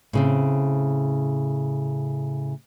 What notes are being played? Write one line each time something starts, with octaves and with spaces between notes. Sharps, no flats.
A2 C#3 C4